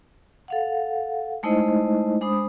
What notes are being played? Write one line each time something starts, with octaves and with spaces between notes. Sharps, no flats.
A4 F5 F#5
G#3 A3 D#4 E4 C5 D#5
G#3 D4 C5 B5 D#6